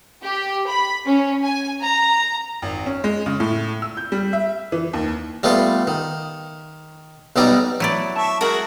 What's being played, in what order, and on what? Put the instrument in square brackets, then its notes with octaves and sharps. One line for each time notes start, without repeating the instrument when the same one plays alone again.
[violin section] G4
B5
C#4
G#5
A#5
[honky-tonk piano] G#1
C#4
G#3
C#3
A2
E6
G6
G3
E5
E3
D#2
[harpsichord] G3 A3 B3 F4 A4
D#3
B1 B2 G3 D#4 D5 A#5
[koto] F#3 E4 D5 [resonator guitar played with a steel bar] A3
[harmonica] E5 C#6 [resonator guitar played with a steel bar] A5
[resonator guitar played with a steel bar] G#3 A3 [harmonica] F#4 G#4 [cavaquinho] A#4 F#5